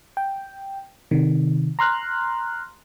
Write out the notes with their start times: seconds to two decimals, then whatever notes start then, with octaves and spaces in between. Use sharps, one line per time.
0.17 G5
1.11 C3 D#3
1.79 A#5 C6 F6 F#6